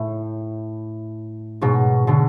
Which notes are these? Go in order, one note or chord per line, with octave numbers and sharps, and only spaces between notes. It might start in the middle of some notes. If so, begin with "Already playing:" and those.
Already playing: A2
G#2 B2
B2 D3